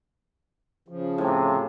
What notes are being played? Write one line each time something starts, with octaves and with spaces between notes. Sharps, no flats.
C#3 F3
A2 C3 G#4